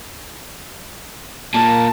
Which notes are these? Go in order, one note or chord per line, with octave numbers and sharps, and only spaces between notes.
A#2 A#3 A5